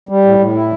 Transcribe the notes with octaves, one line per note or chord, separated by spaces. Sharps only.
G3
A2
A2
E4